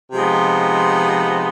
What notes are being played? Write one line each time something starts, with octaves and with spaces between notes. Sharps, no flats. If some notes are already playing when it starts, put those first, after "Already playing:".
C3 F3 G#3 B3 D#4